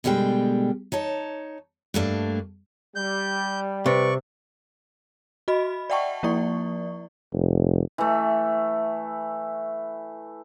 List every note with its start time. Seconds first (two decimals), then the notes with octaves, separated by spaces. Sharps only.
0.04 B2 D3 G3 G#3 G5
0.92 D#4 C#5 A5
1.94 G2 A3 A#3 D4
2.96 G3 G6
3.86 C3 B4 D5 C#6
5.48 F#4 D#5 B5
5.90 D5 E5 F#5 G5 A5 C#6
6.23 F3 A#3 E4 D5 C#6
7.33 F1
7.98 E3 A3